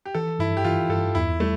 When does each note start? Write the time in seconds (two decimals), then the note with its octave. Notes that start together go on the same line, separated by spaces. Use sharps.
0.05 G4
0.15 E3 A4
0.39 G2 E4
0.57 G4
0.65 E3 F4
0.89 G2 A4
1.15 E2 E4
1.40 G3 A3